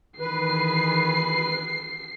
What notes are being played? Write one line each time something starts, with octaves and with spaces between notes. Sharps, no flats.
D#3 E3 B4 C7